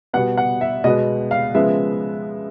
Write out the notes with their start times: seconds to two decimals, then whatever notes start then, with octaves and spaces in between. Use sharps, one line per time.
0.13 B2 G3 B3 F#5
0.38 F#5
0.61 E5
0.84 B2 G#3 B3 D#5
1.31 F5
1.54 C#3 F3 G#3 B3 E5